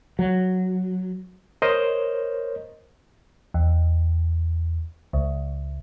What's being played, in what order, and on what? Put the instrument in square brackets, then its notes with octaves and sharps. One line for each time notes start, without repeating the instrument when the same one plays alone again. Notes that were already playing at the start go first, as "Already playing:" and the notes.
[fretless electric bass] F#3
[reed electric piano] A#4 C5 C#5 D#5
[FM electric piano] E2
C#2